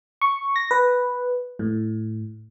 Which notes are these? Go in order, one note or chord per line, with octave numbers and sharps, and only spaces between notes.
C#6
A#6
B4
A2